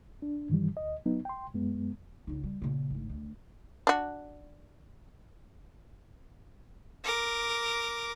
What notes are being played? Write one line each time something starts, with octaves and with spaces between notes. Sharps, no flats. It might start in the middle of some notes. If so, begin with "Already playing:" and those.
D4
G2 D#3 E3 G3
D2 D#5
F#3 B3 D#4
G5 C6
F#2 G#3 B3
C#2 D#4
G3
A#2 C#3
G#1 A2
D2
D4 F#4
A#4 D6